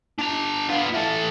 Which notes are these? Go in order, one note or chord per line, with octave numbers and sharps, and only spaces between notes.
D4 A#5
B3 F4
E3 A4